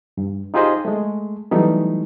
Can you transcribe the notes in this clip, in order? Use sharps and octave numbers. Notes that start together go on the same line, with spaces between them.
G2
D#4 F4 G4 G#4 C5 D#5
G#3 A3
E3 F#3 G3 A3 B3 D#4